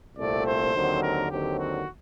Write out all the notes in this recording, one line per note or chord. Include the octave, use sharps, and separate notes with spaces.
C2 A#2 A3 C4 D5
C5
D#2 D3 F#3 C4
A#4
D#2 D3 F#3 C4 G4
F#4